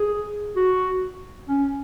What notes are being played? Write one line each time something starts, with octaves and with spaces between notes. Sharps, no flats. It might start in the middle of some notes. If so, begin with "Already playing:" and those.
Already playing: G#4
F#4
C#4